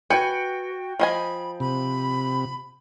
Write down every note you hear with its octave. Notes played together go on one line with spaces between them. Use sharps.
F#4 B4 G5 G#5 G6 C#7
F3 D#5 G#5 B5
C3 B5